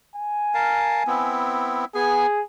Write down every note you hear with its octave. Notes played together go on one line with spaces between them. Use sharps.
G#5
A#4 F5 A5
B3 C4 E4
B3 G#4 G#5